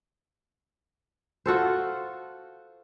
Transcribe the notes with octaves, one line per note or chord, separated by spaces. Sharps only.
F4 F#4 A4 C5